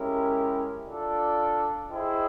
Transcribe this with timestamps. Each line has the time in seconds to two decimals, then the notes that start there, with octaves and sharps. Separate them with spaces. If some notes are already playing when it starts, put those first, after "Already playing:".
Already playing: G#3 C#4 E4 G4 A#4
0.87 D4 F4 A4 D5
1.91 E4 G#4 C5 D#5 G5